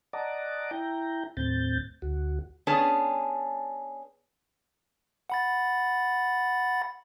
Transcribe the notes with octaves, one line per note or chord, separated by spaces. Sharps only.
D5 D#5 F#5 A5 A#5 D6
E4 G5 A#5
D#2 A2 C4 G6 A6
D2 F#4
B3 C#4 D4 G#4 A5
F#5 B5 A6